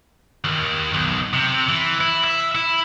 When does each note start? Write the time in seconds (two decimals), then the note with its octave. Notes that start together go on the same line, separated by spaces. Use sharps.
0.44 D#2
0.94 B1
1.33 C3
1.69 E3
2.01 E4
2.24 E5
2.55 E4